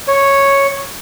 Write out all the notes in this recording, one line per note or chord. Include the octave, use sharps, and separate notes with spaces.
C#5